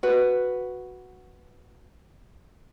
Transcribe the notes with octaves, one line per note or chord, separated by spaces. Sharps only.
F#4 B4